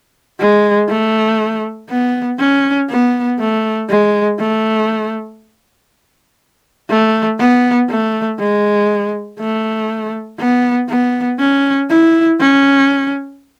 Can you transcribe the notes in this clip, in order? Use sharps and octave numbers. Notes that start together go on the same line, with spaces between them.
G#3
A3
B3
C#4
B3
A3
G#3
A3
A3
B3
A3
G#3
A3
B3
B3
C#4
E4
C#4